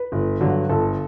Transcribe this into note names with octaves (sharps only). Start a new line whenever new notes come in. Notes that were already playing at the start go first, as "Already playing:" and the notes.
Already playing: B4
G1
G2 D3 F#3
G1 A4